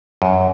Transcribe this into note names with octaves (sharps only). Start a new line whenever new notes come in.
F#2